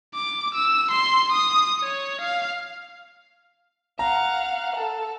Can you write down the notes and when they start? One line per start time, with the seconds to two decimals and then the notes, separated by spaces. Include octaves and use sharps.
0.15 D6
0.55 E6
0.91 C6
1.32 D#6
1.80 C#5
2.21 F5
3.99 F5 F#5 A#5
4.76 A4